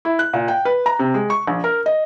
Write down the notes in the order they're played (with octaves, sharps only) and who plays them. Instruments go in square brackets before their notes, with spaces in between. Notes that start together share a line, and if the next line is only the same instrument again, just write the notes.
[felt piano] E4
F#6
A#2
G5
B4
A#5
C3
G#3
C#6
A#1
A#4
D#5